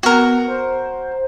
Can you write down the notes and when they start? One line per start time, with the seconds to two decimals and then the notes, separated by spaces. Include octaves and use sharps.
0.03 B3 F#4 A#4
0.48 C5